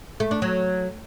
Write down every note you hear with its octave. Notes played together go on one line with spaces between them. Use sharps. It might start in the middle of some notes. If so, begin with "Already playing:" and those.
A3
D4
F#3